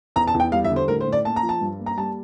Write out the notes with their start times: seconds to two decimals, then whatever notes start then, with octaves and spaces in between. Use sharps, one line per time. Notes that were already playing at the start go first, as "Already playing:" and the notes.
0.16 E2 A#5
0.27 A5
0.34 E2
0.40 G5
0.52 G3 F5
0.64 E5
0.70 D3
0.76 C5
0.88 A2 A#4
1.01 C5
1.07 A2
1.13 D5
1.25 A#3 A5
1.36 A#5
1.43 F3
1.49 A5
1.61 G2
1.80 A#3
1.86 A#5
1.98 G3 A5